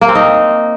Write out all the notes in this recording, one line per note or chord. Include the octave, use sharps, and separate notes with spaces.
A#3
C4
D#4